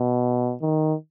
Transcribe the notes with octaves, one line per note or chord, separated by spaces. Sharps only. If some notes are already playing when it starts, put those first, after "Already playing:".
Already playing: B2
D#3